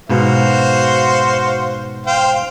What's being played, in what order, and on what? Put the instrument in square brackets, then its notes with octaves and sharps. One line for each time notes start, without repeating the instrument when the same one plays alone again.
[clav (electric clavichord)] G#2 B2 [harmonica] F#4 C5 F5
[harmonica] C5 F5 G5